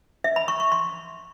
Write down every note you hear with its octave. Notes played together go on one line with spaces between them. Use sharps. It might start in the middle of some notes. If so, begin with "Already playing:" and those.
E5
B5
C#6
C#6
C6